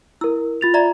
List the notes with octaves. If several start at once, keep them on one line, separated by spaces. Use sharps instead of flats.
E4 A#4 E6
F4 A6 F7
D5 E5 A#5